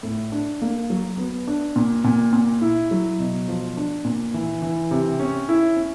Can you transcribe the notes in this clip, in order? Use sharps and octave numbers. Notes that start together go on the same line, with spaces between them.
A2
D4
A#3
F#3
B3
D4
A#2
A#2
A#2
E4
F#3
B2
F3
D4
A#2
E3
E3
C3
C#4
E4
C#4